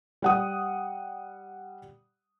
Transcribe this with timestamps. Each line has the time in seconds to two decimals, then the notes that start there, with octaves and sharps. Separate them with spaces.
0.22 G3 F#5 D#6